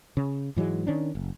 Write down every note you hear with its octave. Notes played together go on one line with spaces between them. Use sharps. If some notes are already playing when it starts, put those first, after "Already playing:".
C#3
G#2 E3 F#3 G#3
D#3 C#4 D4
F#1